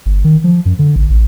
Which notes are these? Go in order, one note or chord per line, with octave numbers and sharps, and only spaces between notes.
G1
D#3
F3
F#2
D3
A1
A1